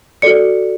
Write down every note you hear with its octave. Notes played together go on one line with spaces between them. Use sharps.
F#4 A4 D5 C#7